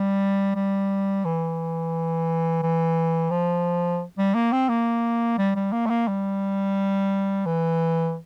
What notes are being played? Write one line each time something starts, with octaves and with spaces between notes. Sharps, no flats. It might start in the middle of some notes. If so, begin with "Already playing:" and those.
Already playing: G3
G3
E3
E3
F3
G3
A#3
C4
A#3
G3
G3
A#3
A3
A#3
G3
E3